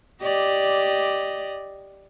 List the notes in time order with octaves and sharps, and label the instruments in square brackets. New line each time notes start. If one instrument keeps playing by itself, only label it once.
[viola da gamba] G4 D5 D#5